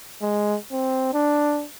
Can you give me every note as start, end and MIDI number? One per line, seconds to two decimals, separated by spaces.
0.21 0.56 56
0.72 1.11 60
1.13 1.65 62